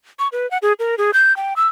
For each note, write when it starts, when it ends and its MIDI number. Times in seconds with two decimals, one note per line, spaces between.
0.19 0.28 85
0.32 0.49 71
0.51 0.58 78
0.62 0.73 68
0.79 0.95 70
0.98 1.11 68
1.14 1.35 91
1.37 1.54 79
1.56 1.68 88